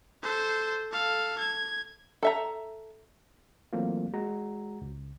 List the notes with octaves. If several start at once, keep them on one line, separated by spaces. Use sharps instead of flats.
A4 C5
A4 F5
G#6
A4 E5 A#5
E3 F#3 A3 A#3 C4 F4
G#3 F#4 A#5
C#2